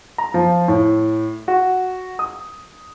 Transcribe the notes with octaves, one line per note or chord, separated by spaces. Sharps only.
A#5
F3
A2
F#4
D#6